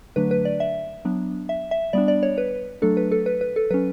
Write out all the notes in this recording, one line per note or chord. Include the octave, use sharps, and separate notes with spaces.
D3 F#3 A3 D4 B4
B4
D5
E5
F#3 B3 D4
E5
E5
G3 B3 D4 D5
D5
C#5
B4
F#3 A3 D4 A4
B4
A4
B4
B4
A4
F#3 C#4 B4